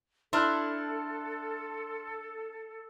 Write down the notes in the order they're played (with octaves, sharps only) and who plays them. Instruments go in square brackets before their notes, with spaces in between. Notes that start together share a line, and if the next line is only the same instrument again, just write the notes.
[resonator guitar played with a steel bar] D4 [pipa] E4 [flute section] A4 [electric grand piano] C6 F6 F#6